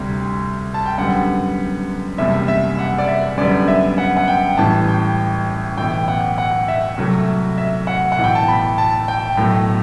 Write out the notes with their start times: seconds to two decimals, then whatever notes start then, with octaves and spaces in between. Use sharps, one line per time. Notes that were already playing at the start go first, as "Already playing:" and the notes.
Already playing: D2 C3 G3
0.74 A5
0.86 G5
0.98 F#2 D3 G3 B3 F#5
2.18 F#1 E2 C3 G3 E5
2.48 E5
2.79 F#5
2.99 D5
3.08 E5
3.37 F#2 D3 G3 B3 D5
3.68 E5
3.98 F#5
4.17 F#5
4.28 G5
4.57 A1 A2 E3 G3 A5
4.88 G5
5.78 B1 A2 E3 G5
6.08 F#5
6.38 F#5
6.68 E5
6.97 C2 C3 F#3 A3
7.58 E5
7.87 F#5
8.12 F#5
8.17 B1 A2 E3
8.24 G5
8.35 A5
8.48 B5
8.78 A5
9.08 G5
9.37 B1 A2 F#3 A3